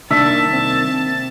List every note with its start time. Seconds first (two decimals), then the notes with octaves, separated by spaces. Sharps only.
0.11 C2 D#3 A#3 D4 E5 A5
0.53 C4